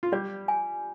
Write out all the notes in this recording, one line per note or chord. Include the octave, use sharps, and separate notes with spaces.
F4
G3 G4 D5
G#5